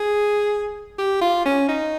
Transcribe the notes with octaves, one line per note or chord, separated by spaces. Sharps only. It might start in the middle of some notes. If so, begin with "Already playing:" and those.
Already playing: G#4
G4
F4
C#4
D#4